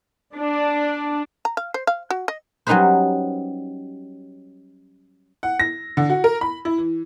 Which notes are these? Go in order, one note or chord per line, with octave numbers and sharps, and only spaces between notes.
D4
A#5
F5
C5
F5
F#4
D#5
F#3 G3 C#4 D#4 B4 C5
F#5
A#6
D3
F#4
A#4
B5
E4
E3